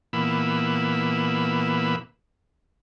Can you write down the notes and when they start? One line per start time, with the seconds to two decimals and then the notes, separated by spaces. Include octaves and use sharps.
0.13 A#2 E3 A#3 B3 B5 E6